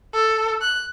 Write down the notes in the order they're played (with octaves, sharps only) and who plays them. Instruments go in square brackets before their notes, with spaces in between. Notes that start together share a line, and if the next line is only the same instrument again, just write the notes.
[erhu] A4
F#6